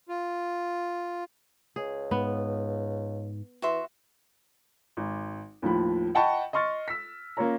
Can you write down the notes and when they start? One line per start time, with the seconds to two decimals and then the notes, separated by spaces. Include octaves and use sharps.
0.09 F4
1.76 C#2 G#4
2.11 G#2 B3
3.62 E3 F#4 E5 C6
4.97 G#1
5.62 D#2 A2 F3 B5
6.15 D#5 F#5 G5 A5 B5 C#6
6.53 D#5 C6 C#6 F6 A6
6.88 E6 B6
7.37 A#3 C#4 F4 C#5 A#5